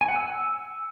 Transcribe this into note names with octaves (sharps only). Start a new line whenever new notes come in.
G#5
F#5
E6